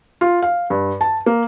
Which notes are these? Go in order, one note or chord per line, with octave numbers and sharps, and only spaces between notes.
F4
F5
G2
A5
A#3